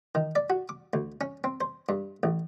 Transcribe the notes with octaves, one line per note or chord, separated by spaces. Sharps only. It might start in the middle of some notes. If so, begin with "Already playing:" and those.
D#3
D5
F#4
D6
D2
C#4
C4
C5
G2
A1